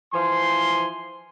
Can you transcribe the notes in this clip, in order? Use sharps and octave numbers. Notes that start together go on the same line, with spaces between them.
E3 F3 G#5 C6